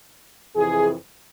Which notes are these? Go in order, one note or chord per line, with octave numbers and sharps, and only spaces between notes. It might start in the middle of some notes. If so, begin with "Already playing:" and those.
F2 C3 E3 G#4